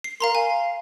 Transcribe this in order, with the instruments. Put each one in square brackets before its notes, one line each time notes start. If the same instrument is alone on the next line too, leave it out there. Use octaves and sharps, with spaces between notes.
[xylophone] C7
[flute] A#4 [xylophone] F5 A#5 C6
[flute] F5 [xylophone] G#5